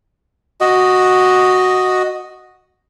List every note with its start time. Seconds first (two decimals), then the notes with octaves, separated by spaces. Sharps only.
0.61 F#4 D#5